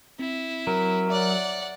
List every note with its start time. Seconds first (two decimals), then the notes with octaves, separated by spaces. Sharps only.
0.19 C4 E4
0.67 F#3 A#4
1.10 C#5 D5 E5 F#5